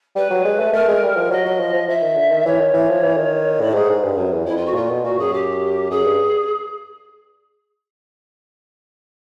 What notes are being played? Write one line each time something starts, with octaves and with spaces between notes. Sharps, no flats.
G3 B4
F#3
G#3
A3
A3 A#4
G#3
G3
F3
F#3 D#5
F#3
F3
F3
F3 E5
D#3
D3
D#3
E3 C#5
D#3
E3
F3
E3
D#3
A2 D5
G4
G#2 G#4
G#2
G2
F#2
E2
F2 E4
F4
F#4
A#2 F4
B2
A#2 F#4
F#2 G#4
G4
F#2 G#4
G2